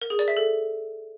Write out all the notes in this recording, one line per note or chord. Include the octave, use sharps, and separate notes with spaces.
A#4
G#4
D5
E5
A4